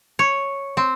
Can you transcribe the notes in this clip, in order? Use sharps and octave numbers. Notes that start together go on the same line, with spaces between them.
C#5
C4